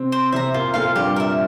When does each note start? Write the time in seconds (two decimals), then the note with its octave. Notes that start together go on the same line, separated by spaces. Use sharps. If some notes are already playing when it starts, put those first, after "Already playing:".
Already playing: C3 C4
0.12 C5
0.32 C3 C4 E5 A#5
0.54 A#2 A#3 F4
0.74 A#2 A#3 A4 C5 F5
0.96 G2 G3 G4
1.16 A#4 E5